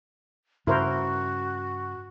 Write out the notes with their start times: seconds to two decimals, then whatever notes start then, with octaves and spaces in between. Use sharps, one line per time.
0.67 G2 C#3 C#4 E4 F#4 A#4 C5